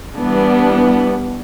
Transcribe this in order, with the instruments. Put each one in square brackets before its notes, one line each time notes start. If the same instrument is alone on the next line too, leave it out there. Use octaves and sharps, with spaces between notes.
[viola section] E3 G3 B3 D4